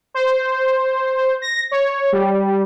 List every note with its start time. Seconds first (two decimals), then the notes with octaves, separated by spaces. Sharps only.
0.14 C5
1.42 A#6
1.71 C#5
2.12 G3